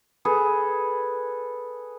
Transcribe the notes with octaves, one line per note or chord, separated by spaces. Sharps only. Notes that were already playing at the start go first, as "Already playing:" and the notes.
G#4 A4 B4